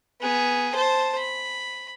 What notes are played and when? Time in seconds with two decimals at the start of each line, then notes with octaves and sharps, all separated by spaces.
0.21 B3 G#4
0.75 C5 A5
1.19 B5